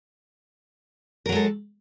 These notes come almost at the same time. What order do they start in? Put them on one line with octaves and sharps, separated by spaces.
A#4 F#3 G#3 A4